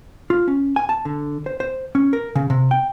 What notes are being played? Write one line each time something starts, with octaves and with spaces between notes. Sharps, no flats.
F4
C#4
G#5
A5
D3
C5
C5
C#4
A#4
C#3
C3
G5